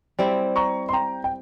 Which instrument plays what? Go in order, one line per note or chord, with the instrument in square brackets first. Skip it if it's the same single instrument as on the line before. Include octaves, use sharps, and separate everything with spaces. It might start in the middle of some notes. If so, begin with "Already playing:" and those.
[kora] G3 C4 E4
[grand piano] A#5 C#6
C6
G5 A#5
G5